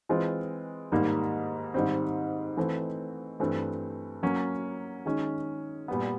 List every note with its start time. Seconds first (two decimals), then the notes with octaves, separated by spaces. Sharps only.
0.09 E3 G#3 C4 F4
0.92 G#2 D#3 G3 A#3
1.74 G#2 D#3 G3 C4
2.57 E3 A3 C4
3.40 G2 E3 A3 C4
4.23 F#3 A#3 C#4
5.06 D#3 G#3 C#4
5.88 A#2 G3 B3